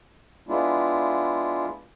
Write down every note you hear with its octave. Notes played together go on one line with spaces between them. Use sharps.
G#3 B3 D4 E4 F4